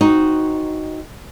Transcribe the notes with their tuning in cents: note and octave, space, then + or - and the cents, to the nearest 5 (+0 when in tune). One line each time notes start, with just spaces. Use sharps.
C4 +5 D#4 +0 F#4 +0